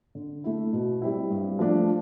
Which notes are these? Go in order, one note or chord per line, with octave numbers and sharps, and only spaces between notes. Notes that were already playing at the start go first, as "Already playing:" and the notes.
D3
A3 E4
B2
G3 C4 E4
G2
F3 A3 D4